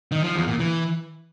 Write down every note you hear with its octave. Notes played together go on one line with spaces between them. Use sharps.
D#3
F3
E2
A#2
E3